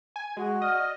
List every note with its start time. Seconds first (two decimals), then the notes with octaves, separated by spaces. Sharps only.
0.16 G#5
0.37 G#3 F#4
0.62 D5 D#5 D#6 F6